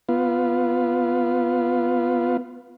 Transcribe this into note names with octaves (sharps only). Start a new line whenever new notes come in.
B3 F4